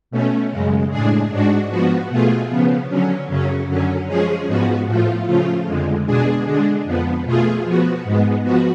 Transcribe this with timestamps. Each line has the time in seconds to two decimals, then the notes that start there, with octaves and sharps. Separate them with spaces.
0.11 B2 A3 C#4
0.51 F#2 C#3 G#3
0.90 A2 G#3 D4 G#4
1.30 G#2 G#3 D4 F#4
1.70 F3 B3 F#4
2.09 B2 A3 F4 G#4
2.50 C#3 F3 B3
2.89 D3 F#3 C#4
3.28 F#2 C#3 F#3 C#4
3.68 F#2 D3 F#3 C#4
4.08 F3 G#3 C#4 G#4
4.47 G#2 F3 B3 F#4
4.87 A2 F3 A3 F4
5.27 C#3 F3 A3 F4
5.66 F2 D3 G#3
6.06 B2 G#3 D4 G#4
6.46 D3 G#3 D4
6.85 F2 F3 B3
7.25 B2 A3 F4 G#4
7.65 F3 B3 F#4
8.04 G#2 G#3 B3
8.43 F3 B3 F#4